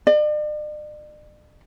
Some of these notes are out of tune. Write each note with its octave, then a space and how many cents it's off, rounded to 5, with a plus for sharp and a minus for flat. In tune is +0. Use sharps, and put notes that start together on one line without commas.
D5 +45